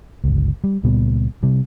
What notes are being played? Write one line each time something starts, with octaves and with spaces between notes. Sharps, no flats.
G1 C#2
G3
C#2 A#2 G3 B3
C3 G3